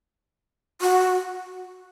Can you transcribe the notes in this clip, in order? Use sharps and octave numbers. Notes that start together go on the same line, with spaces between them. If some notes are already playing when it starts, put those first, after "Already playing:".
F#4